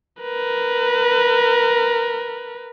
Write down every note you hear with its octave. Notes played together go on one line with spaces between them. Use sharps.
A#4 B4